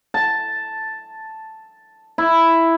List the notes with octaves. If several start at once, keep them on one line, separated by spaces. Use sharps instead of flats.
A5
E4